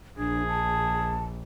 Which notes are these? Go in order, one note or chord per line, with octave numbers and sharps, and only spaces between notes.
A#1 D4 G#4
A5